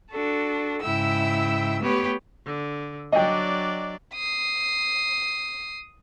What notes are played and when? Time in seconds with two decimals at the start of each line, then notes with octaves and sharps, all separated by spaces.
0.11 D4 F#4 A4
0.82 G#2 C#3 E4 E5 G5 E6
1.82 A3 B3 G4 B4 C#5
2.46 D3
3.12 F#3 D4 D5 D#5 G5
4.14 D#6 C7